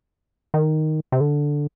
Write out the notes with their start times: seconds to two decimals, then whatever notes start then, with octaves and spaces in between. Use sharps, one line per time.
0.54 D#3
1.12 C3
1.20 D3